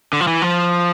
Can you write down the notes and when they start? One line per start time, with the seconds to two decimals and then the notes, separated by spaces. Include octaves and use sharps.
0.13 D3
0.21 F3
0.27 E3
0.42 F3